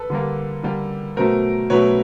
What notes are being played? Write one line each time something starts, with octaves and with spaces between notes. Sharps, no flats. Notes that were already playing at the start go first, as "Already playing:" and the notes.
Already playing: A4 B4
D3 G3 A#3
D3 G3 A#3
B2 F#3 A3 A#4 C5
B2 F#3 A3 B4 C#5